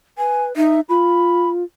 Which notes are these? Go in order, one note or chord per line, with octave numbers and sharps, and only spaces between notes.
B4 G#5
D#4 E5
F4 B5